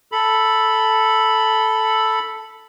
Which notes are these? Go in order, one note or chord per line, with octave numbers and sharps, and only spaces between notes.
A4 B5